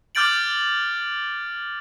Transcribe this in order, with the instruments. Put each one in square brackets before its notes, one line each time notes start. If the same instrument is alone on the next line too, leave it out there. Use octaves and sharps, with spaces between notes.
[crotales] D6 F6 G6 A6 D7 F#7